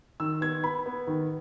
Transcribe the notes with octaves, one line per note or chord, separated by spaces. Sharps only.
D#3 E6
B3 G#6
B3 B5
B3
D#3